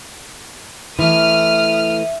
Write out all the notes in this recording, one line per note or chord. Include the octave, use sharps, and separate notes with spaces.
E3 A3 E5 D#6 F6